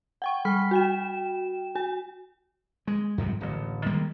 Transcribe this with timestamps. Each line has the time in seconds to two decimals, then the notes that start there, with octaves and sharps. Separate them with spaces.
0.22 F#5 G5 C#6
0.45 G3 B5 F6 B6
0.71 F#4 G5 E7
1.75 F#4 G#5
2.87 G#3
3.18 F2 G#2 C3 G3
3.41 D1 A1
3.86 D#3 G3 G#3 A#3